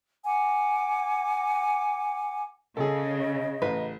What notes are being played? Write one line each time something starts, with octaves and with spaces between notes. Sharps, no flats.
F#5 G#5 D6
C#3 G#4 A4 D#5
A1 B4